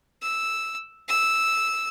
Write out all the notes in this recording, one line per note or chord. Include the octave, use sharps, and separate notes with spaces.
E6
E6